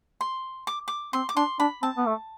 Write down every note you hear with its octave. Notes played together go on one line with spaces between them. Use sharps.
C6
D6
D6
C4 C6
D6
D4 C6
D4 B5
C4 A5
B3
A3